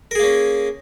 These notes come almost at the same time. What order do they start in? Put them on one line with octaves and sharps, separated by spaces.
A#4 G#4 A#3 C#4